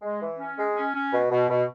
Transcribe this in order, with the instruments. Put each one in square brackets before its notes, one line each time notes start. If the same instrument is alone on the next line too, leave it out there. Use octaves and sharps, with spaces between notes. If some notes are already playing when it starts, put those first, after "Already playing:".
[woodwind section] G#3
E3
C#4
G#3
C#4
C#4
B2
B2
B2